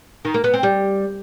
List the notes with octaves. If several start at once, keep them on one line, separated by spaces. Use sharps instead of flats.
D#3
A#3
B3
C4
G3